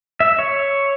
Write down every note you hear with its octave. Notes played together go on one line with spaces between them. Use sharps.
E5
C#5